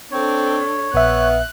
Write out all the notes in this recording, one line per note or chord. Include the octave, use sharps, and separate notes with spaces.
C4 D4 A4 C#5
A#1 B3 E5 F#6